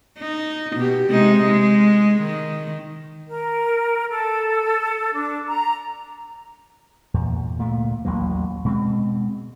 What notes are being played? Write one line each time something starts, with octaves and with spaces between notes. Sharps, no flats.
D#4
B2 G4
C3 G#3 D#4
G#3
D#3
A#4
A4
D4
A#5
E2 A#2
D2 A#2 A3
A1 D#2 F#3 A#3
B2 G#3 A#3 C4